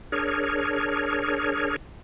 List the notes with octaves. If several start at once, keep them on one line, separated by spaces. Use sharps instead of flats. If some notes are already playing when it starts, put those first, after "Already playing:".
D4 G#4 A#4 C#5